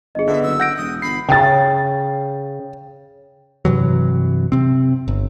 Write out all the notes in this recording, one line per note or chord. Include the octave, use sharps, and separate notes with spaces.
G1 G#4 D#5
D3 B3 E5
F#1 E6
F#5 G6 A#6 D7
E1 D#6
G1 B5 C7
C#3 G5 A6
G2 C3 E3 F#3
C3 C4
G1